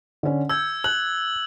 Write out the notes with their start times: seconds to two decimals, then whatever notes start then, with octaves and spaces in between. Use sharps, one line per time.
0.23 D3 C#4
0.49 E6 G6 G#6
0.84 F#6 F#7